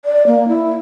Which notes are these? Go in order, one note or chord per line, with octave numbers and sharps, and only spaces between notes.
D5
A#3
E4